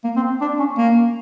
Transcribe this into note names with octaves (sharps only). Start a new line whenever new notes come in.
A#3
C4
D4
C#4
A#3